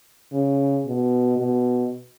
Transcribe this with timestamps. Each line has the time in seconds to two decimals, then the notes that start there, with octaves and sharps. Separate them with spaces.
0.32 C#3
0.86 B2
1.38 B2